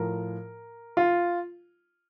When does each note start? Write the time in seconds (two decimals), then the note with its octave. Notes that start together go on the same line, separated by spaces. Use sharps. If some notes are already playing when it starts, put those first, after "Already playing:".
Already playing: A2 F3 A#4
0.97 F4